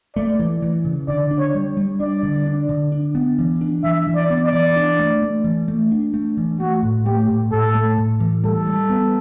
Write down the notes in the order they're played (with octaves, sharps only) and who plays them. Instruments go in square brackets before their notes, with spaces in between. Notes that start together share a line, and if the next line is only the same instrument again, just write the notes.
[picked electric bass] A3 [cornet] D5
[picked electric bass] E3
E3
C#3
[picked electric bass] D3 [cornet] D5
[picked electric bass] D4
[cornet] C#5
[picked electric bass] G3
G3
[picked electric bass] D4 [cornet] D5
[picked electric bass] D3
D4
D3
D4
B3
E3
D4
[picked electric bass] E3 [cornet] E5
[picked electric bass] E3
[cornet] D5
[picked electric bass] B3
[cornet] D5
[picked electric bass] E3
D4
A3
A3
E3
A3
D4
A3
E3
[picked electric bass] A3 [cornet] F#4
[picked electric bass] A2
[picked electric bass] A3 [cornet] G4
[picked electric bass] A2
[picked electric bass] A2 [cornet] A4
[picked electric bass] A3
A2
E3
[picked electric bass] G3 [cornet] A4
[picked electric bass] G3
B3